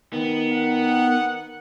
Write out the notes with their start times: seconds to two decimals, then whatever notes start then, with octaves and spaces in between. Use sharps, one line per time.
0.14 D#3 B3
0.53 F#5